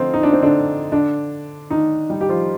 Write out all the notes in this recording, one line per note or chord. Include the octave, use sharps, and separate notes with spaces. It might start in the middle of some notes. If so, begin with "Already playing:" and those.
Already playing: D3 F3 C4 D#4 F4
D#4
D4
C4
D3 D4
D3 D4
D#3 D#4
G3 G4
G4
F3 F4